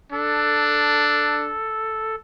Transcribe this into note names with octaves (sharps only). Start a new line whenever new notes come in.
D4 A4